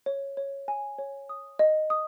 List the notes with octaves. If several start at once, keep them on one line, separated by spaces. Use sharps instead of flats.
C#5
C#5
G#5
C#5
D#6
D#5
D#6